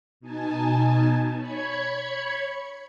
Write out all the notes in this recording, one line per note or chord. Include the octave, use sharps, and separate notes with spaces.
B2 D#4 G#5 A5
C#5 B5 G#6 C#7